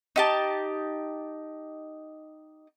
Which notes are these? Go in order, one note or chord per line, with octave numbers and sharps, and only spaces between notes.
D#4 G4 A5